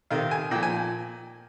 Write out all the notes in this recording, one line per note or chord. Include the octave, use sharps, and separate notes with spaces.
C3 D#3 F5
G#5
A#2 F3 G5
G#5